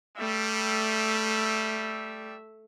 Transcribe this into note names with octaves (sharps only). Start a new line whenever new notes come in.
G3 A3 E5